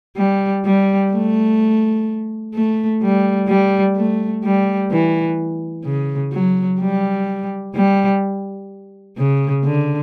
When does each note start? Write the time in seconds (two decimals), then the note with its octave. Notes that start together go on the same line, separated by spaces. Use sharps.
0.17 G3
0.65 G3
1.12 A3
2.55 A3
3.02 G3
3.48 G3
3.96 A3
4.44 G3
4.92 E3
5.85 C#3
6.33 F#3
6.81 G3
7.75 G3
9.18 C#3
9.64 D3